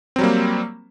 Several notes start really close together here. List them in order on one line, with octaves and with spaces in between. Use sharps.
C4 F#3 G3 A#3